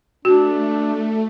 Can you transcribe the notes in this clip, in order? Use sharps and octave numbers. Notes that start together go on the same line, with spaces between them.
A3 D4 F#4